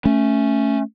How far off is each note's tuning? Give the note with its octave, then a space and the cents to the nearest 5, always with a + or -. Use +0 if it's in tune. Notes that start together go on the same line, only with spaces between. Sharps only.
A3 +0 C#4 +0